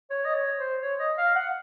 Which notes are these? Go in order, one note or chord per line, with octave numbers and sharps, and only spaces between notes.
C#5
D#5
C#5
C5
C#5
D#5
F5
F#5